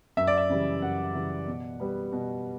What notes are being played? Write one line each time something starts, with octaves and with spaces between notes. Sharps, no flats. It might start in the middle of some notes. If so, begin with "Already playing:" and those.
F#2 E5
D5
E5
C#3 E3 G3
F#2 F#5
C#3 E3 G3
B2
G3 B3
B2